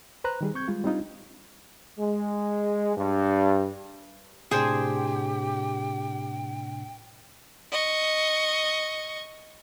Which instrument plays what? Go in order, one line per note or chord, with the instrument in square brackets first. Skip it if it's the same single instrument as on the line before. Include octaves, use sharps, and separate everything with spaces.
[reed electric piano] B4 C5 A#5 F#6
D#3 G3 G#4
C4 C#6 G6 G#6
G3 G#3 F4
G3 C4 D4 D#4 F4
[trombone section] G#3
G2
[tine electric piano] A2 C3 D4 [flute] G4 [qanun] G#4 C5 [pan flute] G5
[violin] D#5 C#6